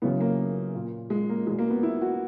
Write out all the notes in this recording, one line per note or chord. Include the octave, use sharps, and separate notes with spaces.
F#2 C#3 E3 B3
A#3
A#2
G#3
A#3
E2 B2 G#3
A#3
B3
E4
F#4